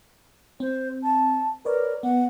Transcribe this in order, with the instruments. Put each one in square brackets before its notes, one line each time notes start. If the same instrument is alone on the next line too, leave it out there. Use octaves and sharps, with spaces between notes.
[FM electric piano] C4 [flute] C5
[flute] A5
[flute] A#4 [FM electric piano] B4 C#5 D5
[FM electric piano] B3 [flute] F#5